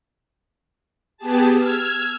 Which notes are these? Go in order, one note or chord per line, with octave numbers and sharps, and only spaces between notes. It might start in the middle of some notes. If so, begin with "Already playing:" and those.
B3 G4 G#4 A5
E6 F6 G#6